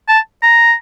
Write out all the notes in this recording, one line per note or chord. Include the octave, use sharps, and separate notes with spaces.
A5
A#5